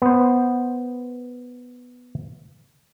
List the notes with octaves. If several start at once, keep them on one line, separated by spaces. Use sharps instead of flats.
B3 C5